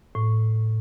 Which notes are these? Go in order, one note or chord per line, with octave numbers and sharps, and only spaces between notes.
A2